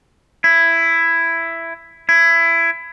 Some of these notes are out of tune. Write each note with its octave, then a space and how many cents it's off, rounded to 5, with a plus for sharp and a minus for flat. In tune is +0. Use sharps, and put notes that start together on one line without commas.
E4 +10
E4 +20